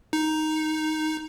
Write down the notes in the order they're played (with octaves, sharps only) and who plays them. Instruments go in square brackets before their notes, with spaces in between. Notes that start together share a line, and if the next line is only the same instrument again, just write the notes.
[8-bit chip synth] D#4